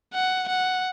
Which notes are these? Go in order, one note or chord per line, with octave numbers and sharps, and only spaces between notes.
F#5
F#5